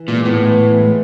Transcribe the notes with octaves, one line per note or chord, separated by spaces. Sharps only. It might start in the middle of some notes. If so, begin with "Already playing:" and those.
Already playing: E3
A#2 G#3
A2 B3
E3
E3
G#3